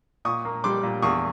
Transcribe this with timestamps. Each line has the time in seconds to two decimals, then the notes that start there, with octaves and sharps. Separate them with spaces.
0.25 A#2 C#6 D#6
0.45 A#3
0.64 G3 C6 D6
0.83 A#2
1.02 E2 C#6 D#6